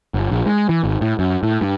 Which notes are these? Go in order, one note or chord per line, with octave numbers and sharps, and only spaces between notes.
G1
A#1
G#3
E3
G#1
A2
F#2
A2
G2